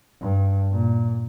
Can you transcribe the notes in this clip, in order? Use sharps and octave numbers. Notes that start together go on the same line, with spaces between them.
G2
A#2